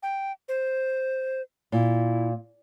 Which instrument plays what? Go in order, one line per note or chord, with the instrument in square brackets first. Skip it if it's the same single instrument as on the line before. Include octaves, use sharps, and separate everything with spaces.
[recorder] G5
C5
[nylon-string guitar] A#2 [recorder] E4